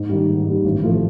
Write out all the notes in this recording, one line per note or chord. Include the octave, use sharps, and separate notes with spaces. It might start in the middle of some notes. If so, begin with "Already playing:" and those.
Already playing: G#2
D#3 G3
G#2
D#3 G3
A1
A2 F3 A3